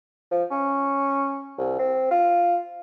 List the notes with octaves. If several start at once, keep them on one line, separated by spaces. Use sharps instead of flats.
F3
C#4
C2
C4
F4